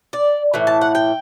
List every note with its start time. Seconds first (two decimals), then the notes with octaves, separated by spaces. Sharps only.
0.13 D5
0.54 A2 E3
0.67 A5
0.81 F#5
0.95 G5